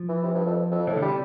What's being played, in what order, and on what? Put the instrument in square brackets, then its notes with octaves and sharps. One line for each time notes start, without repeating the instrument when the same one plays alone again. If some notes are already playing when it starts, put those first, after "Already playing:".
Already playing: [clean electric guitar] F3
[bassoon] E3
C3
G2
F2
F2
[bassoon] A2 [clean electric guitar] E3
[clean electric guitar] D3
[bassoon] G3
[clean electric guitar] C3